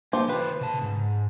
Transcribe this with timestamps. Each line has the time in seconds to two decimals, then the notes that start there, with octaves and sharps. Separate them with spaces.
0.13 A#2 F3 A#3 G4 C5
0.29 E3 B4 C5
0.61 C#3 A5
0.82 G#2